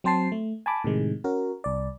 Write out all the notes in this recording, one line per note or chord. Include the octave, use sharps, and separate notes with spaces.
F#3 C4 C5 A5 C7
A3
G#5 A5 B5 D6
A2 C3 D#3 G#3
C#4 F#4 A#4
C2 D5